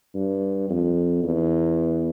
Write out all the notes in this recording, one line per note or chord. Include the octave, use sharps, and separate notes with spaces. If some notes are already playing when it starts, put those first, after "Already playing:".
G2
F2
E2